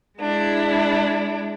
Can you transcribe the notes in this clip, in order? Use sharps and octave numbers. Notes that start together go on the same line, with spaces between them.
G#3 D4 E4